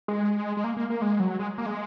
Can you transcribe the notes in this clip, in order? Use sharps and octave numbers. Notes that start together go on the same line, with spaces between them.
G#3
G#3
A#3
A#3
A#3
G#3
F#3
G#3
A#3
G#3